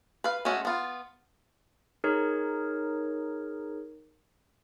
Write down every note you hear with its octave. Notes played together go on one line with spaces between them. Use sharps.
B4 F5
G#3 A3 C#4 F#4
B3 F4
D#4 G#4 A#4 C#5